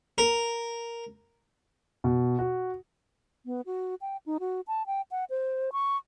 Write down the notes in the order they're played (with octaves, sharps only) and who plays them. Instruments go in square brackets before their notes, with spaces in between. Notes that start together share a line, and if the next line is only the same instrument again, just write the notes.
[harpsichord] A#4
[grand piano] B2
F#4
[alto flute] B3
F#4
G5
D#4
F#4
A5
G5
F#5
C5
C#6